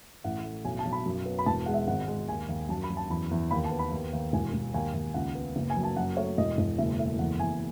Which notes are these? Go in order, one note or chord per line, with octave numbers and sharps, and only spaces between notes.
A1 F#5
A3
B1 G#5
A5
B1
B5
F#2
B3
B5
E1 A5
G#3 F#5
E5
G#1 F#5
G#3
D#2 G#5
D#2
F#2 A5
B5
F#2
A5
E2 B5
E2
D#2 B5
A5
B3
B5
D#2
D#2
E1 G#5
E1
D#2 G#5
D#2
C#2 F#5
B3
F#1
G#5
F#3
A5
F#2 F#5
A3 C#5
E1 D#5
E1
F#1 E5
A3 E5
E2 F#5
E2 G#5